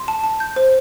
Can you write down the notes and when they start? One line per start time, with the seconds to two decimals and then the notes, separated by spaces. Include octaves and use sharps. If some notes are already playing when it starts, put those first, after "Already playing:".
Already playing: C6
0.08 A5
0.24 A5
0.40 G6
0.56 C5